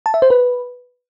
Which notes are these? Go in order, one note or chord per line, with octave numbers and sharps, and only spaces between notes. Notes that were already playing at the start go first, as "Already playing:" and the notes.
A5
E5
C5
B4